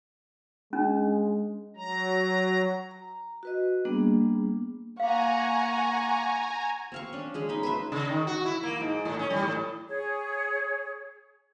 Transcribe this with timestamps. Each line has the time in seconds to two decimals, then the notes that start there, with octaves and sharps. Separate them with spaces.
0.73 G#3 C#4 D4
1.77 F#3 A#5
2.91 A#5
3.43 F#4 B4 D#5
3.85 G3 A#3 B3 D4 G#4
5.00 A#3 F5 F#5 G#5 A#5 C#6
6.92 C4 F5 C#6
7.13 C#4 D4
7.34 G#3 C#4 G#4
7.49 D#4 B5
7.63 B4 C5 E5
7.92 C#3
8.09 D#3
8.27 F#4
8.45 E4
8.63 A#3
8.80 G#2
9.05 A2
9.19 C#4
9.30 G3
9.43 A2
9.88 G#4 C#5